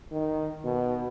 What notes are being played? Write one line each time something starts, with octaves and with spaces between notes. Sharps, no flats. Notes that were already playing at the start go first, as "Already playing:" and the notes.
D#3
B2